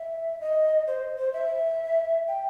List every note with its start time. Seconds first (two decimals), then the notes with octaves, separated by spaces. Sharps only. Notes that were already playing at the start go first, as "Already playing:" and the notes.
Already playing: E5
0.40 D#5
0.87 C5
1.18 C5
1.33 E5
2.28 G5